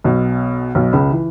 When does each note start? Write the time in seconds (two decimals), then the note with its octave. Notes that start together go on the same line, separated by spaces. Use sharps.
0.04 B1 B2
0.75 B1 B2
0.93 C#2 C#3
1.11 E3